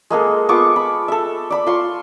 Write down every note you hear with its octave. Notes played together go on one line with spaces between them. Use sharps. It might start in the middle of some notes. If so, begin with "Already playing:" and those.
G#3 A#3 G#4 A4
B3 F4 C#6 D6
B5
A4 E5
D5 B5
F4 C6 C#6